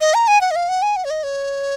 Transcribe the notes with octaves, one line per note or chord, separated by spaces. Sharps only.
D#5
A#5
G#5
F#5
D#5
F5
F#5
G#5
F#5
C#5
D#5
C#5